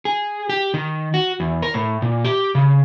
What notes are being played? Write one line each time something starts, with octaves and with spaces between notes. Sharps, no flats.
G#4
G4
D#3
F#4
E2
A#4
A2
A#2
G4
C#3